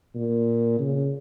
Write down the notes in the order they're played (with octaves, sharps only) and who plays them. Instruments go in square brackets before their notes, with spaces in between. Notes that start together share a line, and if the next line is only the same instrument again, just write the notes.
[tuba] A#2
C#3